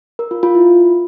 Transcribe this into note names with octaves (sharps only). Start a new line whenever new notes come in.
A#4
F4
F4
E4